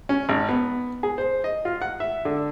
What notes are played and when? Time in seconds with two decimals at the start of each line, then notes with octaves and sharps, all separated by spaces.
0.09 C#4
0.29 G#1
0.49 B3
1.03 G#4
1.18 C5
1.44 D#5
1.65 F4
1.82 F#5
2.00 E5
2.25 D3